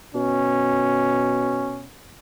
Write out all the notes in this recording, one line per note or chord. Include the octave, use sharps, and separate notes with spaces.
B2 C#4